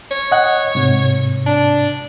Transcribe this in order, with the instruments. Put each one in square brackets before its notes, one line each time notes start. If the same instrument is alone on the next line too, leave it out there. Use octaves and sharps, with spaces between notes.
[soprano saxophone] C#5
[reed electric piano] D#5 F#5
G#2 C3
[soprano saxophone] D4